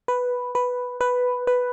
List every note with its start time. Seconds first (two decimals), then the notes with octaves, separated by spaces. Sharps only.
0.08 B4
0.55 B4
1.01 B4
1.47 B4